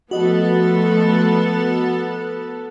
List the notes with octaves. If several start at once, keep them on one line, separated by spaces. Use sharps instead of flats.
F3 A3 B3 F#4 A4 D#5